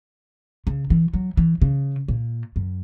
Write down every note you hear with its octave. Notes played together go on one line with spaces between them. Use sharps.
C#3
E3
F#3
E3
C#3
A#2
F#2